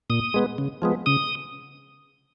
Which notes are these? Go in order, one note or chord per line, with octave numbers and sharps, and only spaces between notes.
A#2 D#6
G#3 B3
C#3
F3 G#3 B3
C#3 D#6